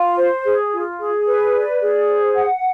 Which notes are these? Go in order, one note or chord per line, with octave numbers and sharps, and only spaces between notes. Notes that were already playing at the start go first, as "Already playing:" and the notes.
Already playing: F4
C5
G#4
F4
G#4
B4
D5
G#4
C5
F#5